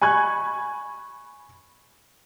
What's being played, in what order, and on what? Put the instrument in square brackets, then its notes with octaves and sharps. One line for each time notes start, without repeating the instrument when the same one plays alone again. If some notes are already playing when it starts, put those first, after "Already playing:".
[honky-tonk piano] G#5 B5 C#6 F#6 G#6